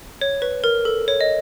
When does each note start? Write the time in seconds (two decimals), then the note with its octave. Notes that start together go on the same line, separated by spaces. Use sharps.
0.21 C#5
0.42 B4
0.64 A#4
0.85 A4
1.08 C#5
1.21 D#5